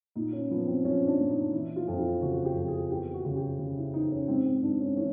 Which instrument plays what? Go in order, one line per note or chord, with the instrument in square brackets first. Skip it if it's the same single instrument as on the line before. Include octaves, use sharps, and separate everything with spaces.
[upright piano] A#2 D#4
C#4
F3 B3
C4
F3 C#4
D4
A#2
D#4
E3 E4
F4
F2
F4
C#3 F#4
F#4
G4
F2
G#4
E2 G4
F#4
C#3
G4
C#3
E4
E2 D#4
C#4
G#2 C4
C4
G#2 D4
C#4
E3 C#4